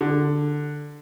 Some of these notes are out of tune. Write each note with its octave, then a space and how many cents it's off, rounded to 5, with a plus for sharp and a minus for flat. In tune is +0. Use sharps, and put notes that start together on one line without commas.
D3 +5